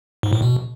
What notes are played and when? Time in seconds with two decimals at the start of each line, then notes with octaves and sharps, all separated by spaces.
0.23 G#2
0.33 A2
0.42 B2